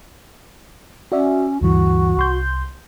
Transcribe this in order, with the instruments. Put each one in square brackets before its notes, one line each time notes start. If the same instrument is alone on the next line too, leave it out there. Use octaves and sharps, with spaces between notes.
[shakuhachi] C#4 [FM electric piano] F#4 D5 E5
[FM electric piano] D2 G2 E3 [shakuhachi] F#4
[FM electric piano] C2 C6 G6